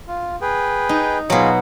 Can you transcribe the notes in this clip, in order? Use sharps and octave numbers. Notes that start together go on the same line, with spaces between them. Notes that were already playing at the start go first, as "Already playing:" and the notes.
F4
G#4 B4 G5
D#4
B2 F#3 F4 G#4